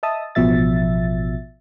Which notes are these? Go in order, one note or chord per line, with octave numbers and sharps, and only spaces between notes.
D#5 E5 A5 D#6
A1 B2 F3 E5 A6